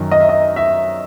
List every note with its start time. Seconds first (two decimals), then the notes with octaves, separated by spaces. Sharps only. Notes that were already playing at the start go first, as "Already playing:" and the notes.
Already playing: F#2 D#3
0.11 D#5
0.20 E5
0.29 D#5
0.56 E5